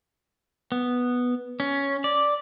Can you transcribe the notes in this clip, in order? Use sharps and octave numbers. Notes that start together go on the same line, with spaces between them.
B3
C#4
D5